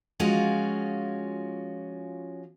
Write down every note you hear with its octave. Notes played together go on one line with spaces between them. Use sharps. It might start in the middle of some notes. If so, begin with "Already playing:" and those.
F3 G#3 C#4 F4 F#4